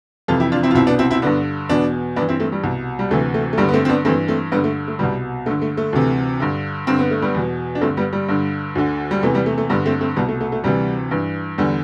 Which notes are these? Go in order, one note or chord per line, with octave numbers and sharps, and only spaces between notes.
F2 C3 E3 F4 A4
E4 G4
D4 F4
C4 E4
F4
C2 B2 C4 E4
B3 D4
C4 E4
C4 E4
G2 D3 B3 D4
E2 B2 B3 D4
G2 E3 B3 D4
C4 E4
A3 C4
G3
C2 B2
G3
D2 C3 E3 A3
A3
A3
G2 D3 G3 B3
B3
A3 C4
C4
B3 D4
G2 E3 A3 C4
A3 C4
G2 D3 G3 B3
A3
A3
C2 B2 G3 B3
G2 D3 A3
A3
A3
D2 C3 E3
G2 D3
G2 D3 C4
B3
A3
G3 B3
E2 B2
D4
G2 D3 A3 C4
G3 B3
G3
G2 D3
D2 D3
G3
E2 C3 E3 A3
G3 B3
A3
A3
G2 D3 G3 B3
A3 C4
A3 C4
C2 B2 G3 B3
A3
A3
A3
D2 C3 E3 G3
G2 E3
E2 D3 G3